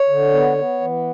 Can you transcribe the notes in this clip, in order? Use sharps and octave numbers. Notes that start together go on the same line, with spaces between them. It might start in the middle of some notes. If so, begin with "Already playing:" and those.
Already playing: C#5
D3
B3
B3
E3